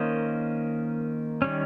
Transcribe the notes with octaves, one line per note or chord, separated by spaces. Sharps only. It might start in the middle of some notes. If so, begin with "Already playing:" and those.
Already playing: D#3 A#3 C#4 C5 D#5
D#3 G3 C#4